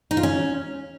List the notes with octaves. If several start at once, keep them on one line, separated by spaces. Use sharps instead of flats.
D#4
F4
C#4